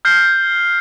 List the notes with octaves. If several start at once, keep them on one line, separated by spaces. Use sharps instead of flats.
F6 G6 C7 G7